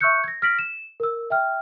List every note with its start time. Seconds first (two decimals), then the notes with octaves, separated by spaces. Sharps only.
0.01 E5 C#6 E6 F#6 G6 C#7
0.24 G#6 A#6
0.42 F6 A#6 B6 D7 F#7
0.59 E7
1.00 A#4 E6
1.30 E5 G5 F6